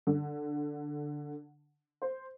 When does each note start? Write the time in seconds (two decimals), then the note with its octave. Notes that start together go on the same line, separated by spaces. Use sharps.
0.07 D3
2.02 C5